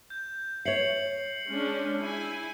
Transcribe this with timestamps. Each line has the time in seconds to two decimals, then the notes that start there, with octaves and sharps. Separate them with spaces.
0.10 G6
0.65 C#5 E5 C7 C#7 F#7
1.48 G#3 C#4 D4
2.01 E4 G#5